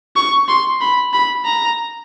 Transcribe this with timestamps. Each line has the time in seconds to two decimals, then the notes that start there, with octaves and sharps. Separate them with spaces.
0.16 C#6
0.49 C6
0.81 B5
1.13 B5
1.46 A#5